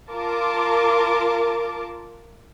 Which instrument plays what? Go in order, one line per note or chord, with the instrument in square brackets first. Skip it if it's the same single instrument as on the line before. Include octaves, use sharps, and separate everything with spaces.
[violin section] F4 A#4 A5 D6